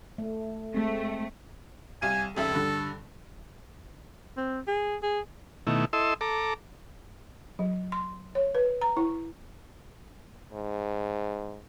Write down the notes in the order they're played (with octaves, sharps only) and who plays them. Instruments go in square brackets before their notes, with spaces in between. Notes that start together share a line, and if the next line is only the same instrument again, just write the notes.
[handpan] A3
[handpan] G#3 C4 [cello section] A3
[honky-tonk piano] C2 F5 D#7 [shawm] G#5
[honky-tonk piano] F1 C#2 E5 [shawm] A4
[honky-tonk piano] G2 D3
[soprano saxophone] C4
G#4
G#4
[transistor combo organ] B2 D#3 A3 E4
E4 A4 D#5 C6 E6
A4 A#5 D6
[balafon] F#3
C6
C#5
B4
A#5
E4
[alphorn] G#2